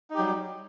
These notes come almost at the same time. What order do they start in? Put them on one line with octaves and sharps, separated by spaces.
D#4 G4 F#3 G3